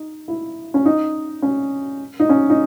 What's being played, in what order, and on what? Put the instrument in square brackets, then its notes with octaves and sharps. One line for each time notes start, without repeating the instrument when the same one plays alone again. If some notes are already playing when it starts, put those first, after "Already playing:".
Already playing: [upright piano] D#4
E4
C#4
D#4
C#4
D#4
C#4
D#4